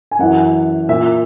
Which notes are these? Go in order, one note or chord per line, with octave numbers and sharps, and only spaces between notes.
G#5
F#2 E3 F#5
A#2 E5